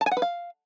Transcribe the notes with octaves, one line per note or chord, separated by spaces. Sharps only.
A5
G#5
F#5
B4
F5